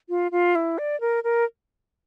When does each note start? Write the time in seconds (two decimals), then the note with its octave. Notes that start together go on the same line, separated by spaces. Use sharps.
0.09 F4
0.32 F4
0.55 E4
0.78 D5
1.01 A#4
1.24 A#4